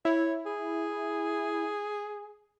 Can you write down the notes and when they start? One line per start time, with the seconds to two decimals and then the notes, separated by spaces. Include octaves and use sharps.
0.05 E4 C#5
0.46 G#4